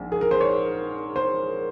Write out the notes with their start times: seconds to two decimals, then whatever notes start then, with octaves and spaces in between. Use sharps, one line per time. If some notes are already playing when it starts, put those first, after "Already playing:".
Already playing: A#1 G#2
0.12 G#4
0.21 A#4
0.31 C5
0.41 C#5
1.16 C5